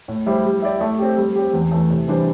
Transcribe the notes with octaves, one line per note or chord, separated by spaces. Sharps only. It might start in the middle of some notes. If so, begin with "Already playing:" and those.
A2
G3 E4 G4 C5
G3
E4 G4 D5
A3
C4 G4
G3
C4 G4
E2
E3 A3
C3
E3 G3 D4 C5